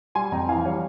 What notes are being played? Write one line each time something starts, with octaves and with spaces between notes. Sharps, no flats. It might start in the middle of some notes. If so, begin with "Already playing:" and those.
G3 G#5 C6
F2 G5 A#5
E3 F5 G#5
G3 C#5 F5